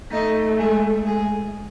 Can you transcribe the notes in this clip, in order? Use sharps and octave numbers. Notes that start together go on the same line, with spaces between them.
A3 D#4 D#5
G#3 G#4
G#3 G#4